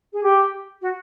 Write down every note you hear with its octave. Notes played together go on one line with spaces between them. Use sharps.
G#4
G4
F#4